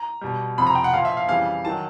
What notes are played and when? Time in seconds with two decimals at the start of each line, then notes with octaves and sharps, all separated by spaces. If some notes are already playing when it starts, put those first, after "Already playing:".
Already playing: A#5
0.21 B2 G3
0.57 F2 C3 F3 B5
0.67 A#5
0.75 G5
0.84 F#5
0.93 A#2 F3 F5
1.05 E5
1.17 F5
1.28 F2 C#3 E3 G3 F5
1.65 D#3 F#3 A5